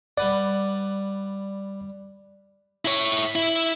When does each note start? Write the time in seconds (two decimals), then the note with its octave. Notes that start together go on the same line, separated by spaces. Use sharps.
0.17 G3 B4 D5 F#5
2.85 E4 C#5
3.35 E4